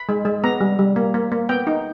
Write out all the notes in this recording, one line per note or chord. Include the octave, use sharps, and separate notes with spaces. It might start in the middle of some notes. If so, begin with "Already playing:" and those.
Already playing: B5
G#3
G#3
B3 A#5
G3
G3
A#3
A#3
A#3
B3 G5
D#4